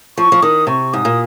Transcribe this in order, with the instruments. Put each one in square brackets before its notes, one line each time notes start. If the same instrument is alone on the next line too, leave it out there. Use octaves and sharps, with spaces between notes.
[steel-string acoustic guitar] F3 [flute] C#6
[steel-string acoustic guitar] F3
[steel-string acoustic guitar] D#3 [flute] D#6
[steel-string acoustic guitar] C3 [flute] C#6
[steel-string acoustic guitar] G#2 [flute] D#6
[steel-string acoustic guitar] A#2